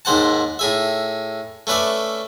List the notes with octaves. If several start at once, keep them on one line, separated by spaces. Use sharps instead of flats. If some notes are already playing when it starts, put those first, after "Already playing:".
D#2 G#2 C5 F#5 A5
A2 G#4 E5
A3 C#4 B4 D5 E5